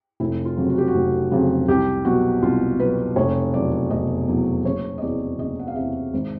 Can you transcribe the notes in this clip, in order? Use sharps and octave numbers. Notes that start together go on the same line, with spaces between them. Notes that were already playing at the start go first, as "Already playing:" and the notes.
F1 E4
F4
F2 C#3 F#3
F#4
G4
F#4
F1
F2 C#3 F#3
C2 G4
B2 F#3 F#4
C2 F4
B2 F#3 B4
F1 C#5
E2 B2 F#3 D5
F1 D#5
E2 B2 F#3
F#1 C#5
D#5
E2 C3 D5
F#1 D#5
F#5
F5
E2 C3 E5
G#1